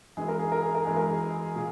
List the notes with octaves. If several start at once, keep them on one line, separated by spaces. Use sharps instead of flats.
F#2 E3 G#3 G#4
A#4
G#4
A#4
G#4
A#4
F#2 E3 G#3 G#4
A#4
G#4
A#2 G#4